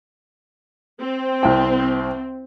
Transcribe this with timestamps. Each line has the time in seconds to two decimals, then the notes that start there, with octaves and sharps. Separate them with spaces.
1.00 C4
1.43 C2 G5